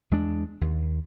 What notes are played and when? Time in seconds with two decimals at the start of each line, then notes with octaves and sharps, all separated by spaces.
0.11 E2 G#3 D4
0.61 D#2